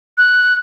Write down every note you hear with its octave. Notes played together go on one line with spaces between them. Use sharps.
F#6